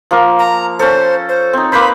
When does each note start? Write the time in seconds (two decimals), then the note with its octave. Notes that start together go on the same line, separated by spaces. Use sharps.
0.11 F3 A#3 A#4
0.39 A#5
0.79 C#4 A4 C5
1.29 C5
1.53 C4 D#4
1.72 A#3 B4 C5 B5